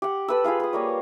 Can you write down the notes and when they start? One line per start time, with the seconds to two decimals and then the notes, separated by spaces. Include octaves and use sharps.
0.02 G4 F#5
0.28 A4 B4 E6
0.44 F4 G#4 B4 F5
0.60 B4 D#6
0.73 G3 A#3 C#5